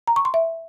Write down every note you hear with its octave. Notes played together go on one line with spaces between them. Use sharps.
A#5
C#6
C6
E5